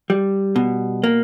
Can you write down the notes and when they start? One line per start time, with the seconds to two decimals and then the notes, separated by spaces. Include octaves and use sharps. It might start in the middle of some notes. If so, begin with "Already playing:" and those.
0.10 G3
0.56 B2
1.04 A#3